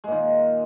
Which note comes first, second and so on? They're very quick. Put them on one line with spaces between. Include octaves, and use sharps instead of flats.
G#3 A#2 D#3